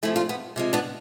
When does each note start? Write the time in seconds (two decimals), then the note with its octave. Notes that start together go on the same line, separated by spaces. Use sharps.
0.03 C3 F3 A3 E4 G#4
0.16 D4 F4
0.29 B3
0.56 C3 F3 G#3
0.73 B3 D4